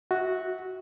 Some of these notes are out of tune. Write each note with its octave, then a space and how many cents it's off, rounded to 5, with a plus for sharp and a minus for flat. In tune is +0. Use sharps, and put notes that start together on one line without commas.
F#4 +0 E5 -30